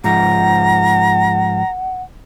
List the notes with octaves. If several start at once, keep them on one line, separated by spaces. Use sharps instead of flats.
G#2 F3 F#5 A#5